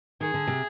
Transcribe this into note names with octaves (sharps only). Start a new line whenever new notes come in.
D#3 G#4
D3
C3